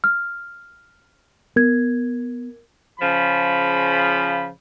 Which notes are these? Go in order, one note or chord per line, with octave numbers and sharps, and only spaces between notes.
F6
B3 A#4 G#6
C#3 F3 B5